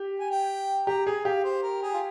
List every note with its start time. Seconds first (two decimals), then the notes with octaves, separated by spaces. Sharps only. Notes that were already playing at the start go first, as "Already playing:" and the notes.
Already playing: G4
0.20 G#5
0.31 G5
0.87 G4 A#5
1.06 G#4 G#5
1.25 G4 F5
1.44 C5
1.62 A#4
1.82 G#4
1.94 F4